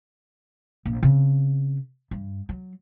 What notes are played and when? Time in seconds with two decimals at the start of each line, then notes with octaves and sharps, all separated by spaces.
0.85 A#1
1.03 C#3 C4
2.11 G2
2.49 F#3